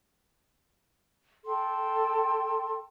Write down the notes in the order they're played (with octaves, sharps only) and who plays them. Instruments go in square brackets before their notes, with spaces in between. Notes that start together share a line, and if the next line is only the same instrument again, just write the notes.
[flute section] A4 G5 C6